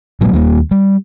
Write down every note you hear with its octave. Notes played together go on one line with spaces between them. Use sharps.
A#2 F#3 G#3 A#3
D#2 D#3 G3 A#3
G3